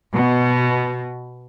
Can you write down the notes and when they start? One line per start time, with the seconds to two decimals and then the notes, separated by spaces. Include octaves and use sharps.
0.14 B2